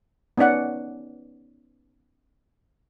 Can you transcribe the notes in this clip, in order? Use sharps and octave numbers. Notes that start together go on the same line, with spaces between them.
B3 C#4 D#4 D5 F#5